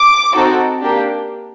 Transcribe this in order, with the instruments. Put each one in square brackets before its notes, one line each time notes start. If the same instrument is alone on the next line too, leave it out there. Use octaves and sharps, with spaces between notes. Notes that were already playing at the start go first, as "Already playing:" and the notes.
Already playing: [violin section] D6
C4 D#4 F#4 A4
A#3 D4 G4